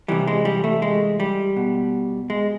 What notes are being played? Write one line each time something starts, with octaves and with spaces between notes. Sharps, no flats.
C3 E3 G3
G#3
G3
A3
G#3
G3
B2
G#3